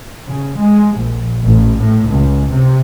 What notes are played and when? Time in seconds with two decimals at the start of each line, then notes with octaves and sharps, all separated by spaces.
0.27 C#3
0.58 G#3
0.96 A#1
1.45 A1
1.79 A2
2.11 C#2
2.50 C3